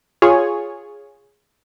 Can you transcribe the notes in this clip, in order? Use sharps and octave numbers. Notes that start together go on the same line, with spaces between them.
F4 G#4 C#5